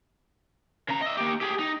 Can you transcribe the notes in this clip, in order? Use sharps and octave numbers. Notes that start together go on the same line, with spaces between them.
C#3 A#5
D#5 E5
A#3 G4
G4 G#4
D#4